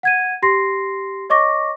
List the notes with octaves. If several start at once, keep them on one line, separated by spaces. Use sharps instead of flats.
F#5 G#6 D#7
G4 C6 A#6 C7
C#5 D#5 C#6 D6 A#6